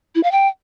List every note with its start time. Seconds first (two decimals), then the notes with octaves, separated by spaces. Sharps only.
0.15 E4
0.23 F5
0.32 G5